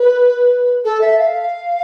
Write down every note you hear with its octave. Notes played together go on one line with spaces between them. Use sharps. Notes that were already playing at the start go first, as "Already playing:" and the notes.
Already playing: B4
A4
E5
F5